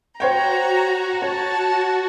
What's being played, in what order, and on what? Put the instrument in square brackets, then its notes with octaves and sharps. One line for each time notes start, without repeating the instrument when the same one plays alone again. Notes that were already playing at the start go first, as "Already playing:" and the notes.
[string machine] F#4 [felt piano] C5 C#5 G5 [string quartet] A#5
[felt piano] C#5 [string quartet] A5